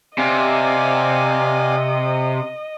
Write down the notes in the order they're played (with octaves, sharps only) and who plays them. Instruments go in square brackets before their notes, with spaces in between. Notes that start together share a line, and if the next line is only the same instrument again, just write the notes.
[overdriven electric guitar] C3 [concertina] D5 F5 G#5 [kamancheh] D#5